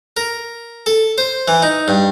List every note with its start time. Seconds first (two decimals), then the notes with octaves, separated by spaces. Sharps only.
0.17 A#4
0.86 A4
1.18 C5
1.48 E3
1.62 D#4
1.88 G2